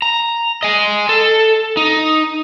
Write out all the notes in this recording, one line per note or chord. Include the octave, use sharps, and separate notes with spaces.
A#5
D#5 G#5
A4
D#4